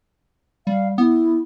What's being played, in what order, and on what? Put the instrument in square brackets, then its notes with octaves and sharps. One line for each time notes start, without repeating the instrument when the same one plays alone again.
[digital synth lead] G3 [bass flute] F5
[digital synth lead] B3 [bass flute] E4